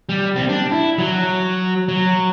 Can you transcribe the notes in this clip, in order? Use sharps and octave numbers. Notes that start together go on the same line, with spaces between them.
G3
G3 C4
D4
E4
F#3
F#3